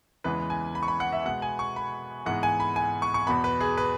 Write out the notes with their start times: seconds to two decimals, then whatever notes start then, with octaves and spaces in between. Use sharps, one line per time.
0.24 E2 C#3 E3 G#3 B3 B4
0.50 G#5
0.75 B5
0.83 C#6
0.88 B5
1.00 F#5
1.12 E5
1.25 B2 G#3 B3 F#5
1.42 G#5
1.59 C#6
1.76 B5
2.26 G#2 E3 G#3 B3 F#5
2.43 G#5
2.60 B5
2.76 G#5
3.02 C#6
3.14 C#6
3.27 E2 B2 B3 B5
3.44 B4
3.60 G#4
3.77 B4